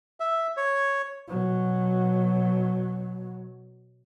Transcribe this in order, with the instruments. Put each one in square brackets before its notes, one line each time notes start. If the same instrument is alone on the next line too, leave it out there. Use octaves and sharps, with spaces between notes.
[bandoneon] E5
C#5
[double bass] B2 F#3